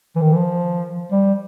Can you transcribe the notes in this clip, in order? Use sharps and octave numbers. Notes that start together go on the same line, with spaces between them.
E3
D#3
E3
F3
G3